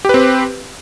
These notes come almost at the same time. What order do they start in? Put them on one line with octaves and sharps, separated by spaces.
G4 B4 C4